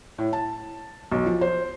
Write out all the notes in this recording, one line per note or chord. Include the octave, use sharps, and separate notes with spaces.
A2
A5
B1
F3
C5